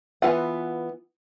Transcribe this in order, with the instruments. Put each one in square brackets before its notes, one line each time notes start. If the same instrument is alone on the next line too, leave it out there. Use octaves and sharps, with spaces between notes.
[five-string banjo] E3 B3 F4 F#5